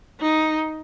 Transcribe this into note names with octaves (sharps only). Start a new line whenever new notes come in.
D#4